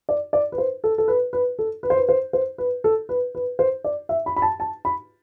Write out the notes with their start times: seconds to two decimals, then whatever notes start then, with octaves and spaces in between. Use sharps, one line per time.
0.09 D5
0.33 D5
0.52 B4
0.58 C5
0.84 A4
0.98 A4
1.08 B4
1.33 B4
1.59 A4
1.83 B4
1.90 C5
1.97 B4
2.09 C5
2.33 C5
2.58 B4
2.84 A4
3.09 B4
3.35 B4
3.59 C5
3.84 D5
4.09 E5
4.26 B5
4.36 B5
4.42 A5
4.60 A5
4.85 B5